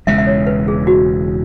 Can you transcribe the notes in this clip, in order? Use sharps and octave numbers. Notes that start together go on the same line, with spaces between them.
E1 E2 C#3 G#3 E5
E5
C#5
B4
G#4
F#4